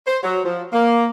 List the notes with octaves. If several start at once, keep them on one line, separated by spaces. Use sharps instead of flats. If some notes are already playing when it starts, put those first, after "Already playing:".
C5
F#3
F3
A#3